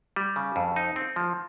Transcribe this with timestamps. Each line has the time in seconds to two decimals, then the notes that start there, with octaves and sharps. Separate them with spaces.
0.16 G3
0.36 C#3
0.56 F2
0.76 D#4
0.96 C4
1.16 F3